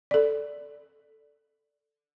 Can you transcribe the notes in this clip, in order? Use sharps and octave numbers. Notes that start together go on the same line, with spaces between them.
A4 D5